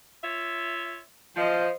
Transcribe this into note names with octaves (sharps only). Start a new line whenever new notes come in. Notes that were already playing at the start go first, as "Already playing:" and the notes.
F4 C#5 E5
F3 C5 D#5